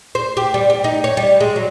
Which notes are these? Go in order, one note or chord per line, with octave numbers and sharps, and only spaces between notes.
C5
G4
G3
G4
D#4
C#5
G3
G#3
F#3